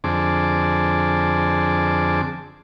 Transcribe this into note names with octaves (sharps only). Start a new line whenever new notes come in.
F2 D3 C4 G#4 A5 D6